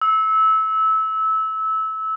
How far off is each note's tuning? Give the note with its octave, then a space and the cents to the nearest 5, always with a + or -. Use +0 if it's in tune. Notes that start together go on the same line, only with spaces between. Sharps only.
E6 -20